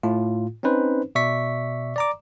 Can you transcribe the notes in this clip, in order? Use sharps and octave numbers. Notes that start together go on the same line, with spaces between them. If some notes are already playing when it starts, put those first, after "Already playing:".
A2 F4
C4 C#4 D#4 B4 C5
B2 D5 E5 C#6 B6
D5 A#5 D6